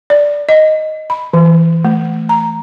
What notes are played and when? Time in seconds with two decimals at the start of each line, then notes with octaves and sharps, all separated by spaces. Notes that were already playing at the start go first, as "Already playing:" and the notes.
0.10 D5
0.49 D#5
1.10 B5
1.33 E3
1.85 A3
2.29 A#5